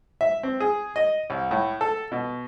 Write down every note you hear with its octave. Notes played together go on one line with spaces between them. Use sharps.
E5
C4
G#4
D#5
C2
A2
A4
B2